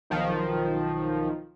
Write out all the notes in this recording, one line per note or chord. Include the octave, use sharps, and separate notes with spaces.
B1 D#3 F3